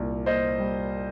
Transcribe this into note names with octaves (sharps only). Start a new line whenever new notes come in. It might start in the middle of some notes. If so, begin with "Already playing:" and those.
Already playing: C2 A#2
A#2 C5 D#5
G3